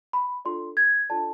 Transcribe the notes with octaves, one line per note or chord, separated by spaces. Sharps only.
B5
D4 F4 A4 D5 C6
G#6
D4 F4 A4 D5 A5